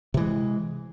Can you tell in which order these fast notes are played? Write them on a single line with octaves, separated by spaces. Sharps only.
C3 E3 G#3